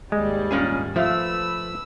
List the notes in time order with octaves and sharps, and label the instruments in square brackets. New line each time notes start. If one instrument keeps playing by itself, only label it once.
[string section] G#1 D#2 G3 [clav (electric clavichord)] G#3
[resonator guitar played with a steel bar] A#2 C#4 G#4
[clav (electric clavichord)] F3 F5 [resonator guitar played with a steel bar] A3 [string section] B4 E6